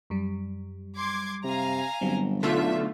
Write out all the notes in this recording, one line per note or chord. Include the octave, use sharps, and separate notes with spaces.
F#2 G3
C6 D6 G#6
C3 F5 G#5 A#5
G1 F#3 G3 C4
B1 D3 A3 F4 E5